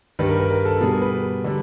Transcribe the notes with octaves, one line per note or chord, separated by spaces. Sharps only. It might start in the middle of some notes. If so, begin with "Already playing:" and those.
G2 D#3 G3 B4
A#4
B4
A#4
A4
B2 G3 G#4
A#4
B4
D3 G3